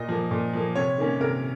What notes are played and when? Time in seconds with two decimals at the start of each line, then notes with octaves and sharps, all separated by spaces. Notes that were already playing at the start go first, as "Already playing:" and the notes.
Already playing: A#2 D#5
0.09 F3 A#3
0.31 A#2
0.53 F3 A#3
0.75 C3 C#5
0.98 D#3 A#3 C#4
1.21 C3 A#4